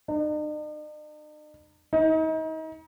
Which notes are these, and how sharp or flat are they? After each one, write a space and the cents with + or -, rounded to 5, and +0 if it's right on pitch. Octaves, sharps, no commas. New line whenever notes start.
D#4 -45
D#4 +35